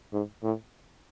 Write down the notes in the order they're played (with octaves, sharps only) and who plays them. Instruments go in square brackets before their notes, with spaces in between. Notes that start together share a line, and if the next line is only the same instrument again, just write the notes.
[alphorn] G#2
A2